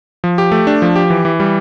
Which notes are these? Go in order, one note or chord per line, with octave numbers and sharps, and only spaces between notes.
F3
G4
A3
D4
F3
G4
E3
E3
G3